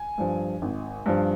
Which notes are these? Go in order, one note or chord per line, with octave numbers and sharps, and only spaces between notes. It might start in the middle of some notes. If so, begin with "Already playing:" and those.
Already playing: G#5
G2 F3
G#1
G2 F3